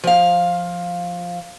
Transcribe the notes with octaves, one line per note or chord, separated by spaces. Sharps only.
F3 F5